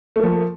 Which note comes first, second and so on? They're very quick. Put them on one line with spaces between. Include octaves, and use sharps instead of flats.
A3 A#3 F3